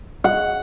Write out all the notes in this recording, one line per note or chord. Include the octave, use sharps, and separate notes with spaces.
F#5